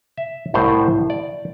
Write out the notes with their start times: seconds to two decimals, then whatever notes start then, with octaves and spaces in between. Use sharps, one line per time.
0.18 E5
0.54 C2 A2 E4 C5
1.10 D5